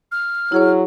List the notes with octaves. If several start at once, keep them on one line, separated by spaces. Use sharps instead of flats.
F6
F#3 E4 G#4 C#5